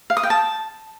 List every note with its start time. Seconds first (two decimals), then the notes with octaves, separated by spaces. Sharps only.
0.10 F5
0.17 D#6
0.23 G5
0.30 A5